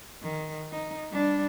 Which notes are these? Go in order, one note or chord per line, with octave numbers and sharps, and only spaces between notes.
D#3
D#4
G3 D4